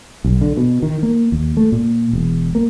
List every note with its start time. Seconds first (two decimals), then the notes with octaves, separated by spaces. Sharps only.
0.24 B1
0.41 D3
0.57 B2
0.83 D#3
1.03 A#3
1.32 D#2
1.57 A3
1.72 A#2
2.13 E1
2.55 A#3